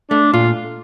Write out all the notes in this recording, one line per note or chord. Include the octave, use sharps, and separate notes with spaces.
A3 D4
A#2 F4